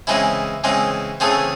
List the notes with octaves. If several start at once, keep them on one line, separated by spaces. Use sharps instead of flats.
C#3 E3 G#3 C4 E4
C#3 E3 G#3 C4
C#3 E3 A3 C4 G#4